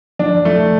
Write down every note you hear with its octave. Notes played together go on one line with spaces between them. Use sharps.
F3 D4
F3 A3